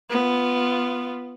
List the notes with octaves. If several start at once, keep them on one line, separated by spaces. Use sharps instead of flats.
B3 F4